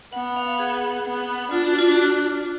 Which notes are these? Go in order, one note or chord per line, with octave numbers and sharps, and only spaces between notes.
B3 F#5
F5
G#4
B3
D4 F4
F#4
F4
F#4
F4